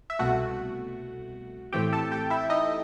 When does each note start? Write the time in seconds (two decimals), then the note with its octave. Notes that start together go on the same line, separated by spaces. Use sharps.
0.10 E5
0.19 C2 B2 A3 F#4 F#5
1.72 A2 E3 A3 C4 G4 G5
1.93 A4 A5
2.12 G4 G5
2.30 E4 E5
2.50 D#4 D#5